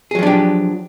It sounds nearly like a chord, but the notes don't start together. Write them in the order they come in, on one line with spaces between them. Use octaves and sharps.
G#4 F#3 F3 D4 G4